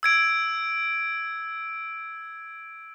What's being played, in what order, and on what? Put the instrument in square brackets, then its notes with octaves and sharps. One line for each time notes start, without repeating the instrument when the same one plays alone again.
[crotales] E6 G#6 D7